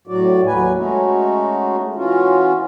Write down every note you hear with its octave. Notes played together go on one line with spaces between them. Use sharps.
A2 F#3 F#4 D5
D#2 F#3 B4 G#5
G#3 A3 C#4 D#4 F#4
E3 C#4 F4 F#4